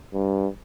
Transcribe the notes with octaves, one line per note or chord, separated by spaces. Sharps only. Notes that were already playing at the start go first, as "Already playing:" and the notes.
G2